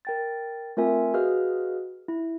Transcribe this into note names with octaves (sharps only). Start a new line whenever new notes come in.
A#4 G5 A6
A3 C4 F4 A#4 E5 G#5
F#4 G#4 B4 D#5 F5 F6
E4